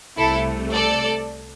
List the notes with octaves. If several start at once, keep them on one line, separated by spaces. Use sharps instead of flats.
C2 C3 A3 E4 A4
A4 D5